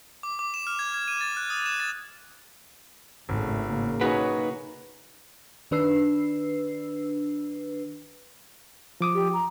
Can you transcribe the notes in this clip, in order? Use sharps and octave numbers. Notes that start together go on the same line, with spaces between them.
D6
D6
E7
F6
G#6
G#6
D#7
A6
F#6
D#6
E7
A6
G#1 A2 C#3 A3
C#3 A#3
D#4 F#4 G#4 B4 C#5
D#3 D4 B4 E6 C7
F3 D6 D#6
G4
A#5